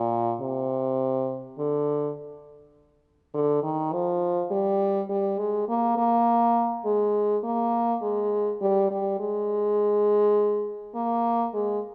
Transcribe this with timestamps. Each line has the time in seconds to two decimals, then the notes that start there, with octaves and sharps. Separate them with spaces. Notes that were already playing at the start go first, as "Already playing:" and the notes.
Already playing: A#2
0.41 C3
1.58 D3
3.34 D3
3.63 D#3
3.92 F3
4.51 G3
5.09 G3
5.38 G#3
5.69 A#3
5.97 A#3
6.85 G#3
7.44 A#3
8.02 G#3
8.61 G3
8.91 G3
9.19 G#3
10.95 A#3
11.54 G#3